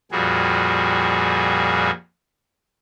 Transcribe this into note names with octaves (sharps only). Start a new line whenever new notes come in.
F2 A#2 G3 F#4 G#4